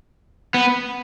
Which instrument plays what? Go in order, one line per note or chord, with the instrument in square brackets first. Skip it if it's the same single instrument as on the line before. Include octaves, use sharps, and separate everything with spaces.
[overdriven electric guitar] B3